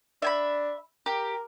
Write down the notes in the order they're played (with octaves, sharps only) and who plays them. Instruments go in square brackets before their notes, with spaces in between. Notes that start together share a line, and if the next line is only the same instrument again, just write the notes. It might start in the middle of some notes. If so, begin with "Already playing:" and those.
[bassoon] D4 [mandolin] E5 G#5 B5
[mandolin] G4 [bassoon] A#4